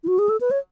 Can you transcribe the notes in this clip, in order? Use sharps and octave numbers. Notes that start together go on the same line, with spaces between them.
E4
F#4
G#4
A4
B4
C#5